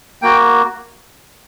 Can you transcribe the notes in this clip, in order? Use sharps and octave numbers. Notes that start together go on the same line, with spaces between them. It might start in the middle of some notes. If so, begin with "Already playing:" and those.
A#3 F#4 G5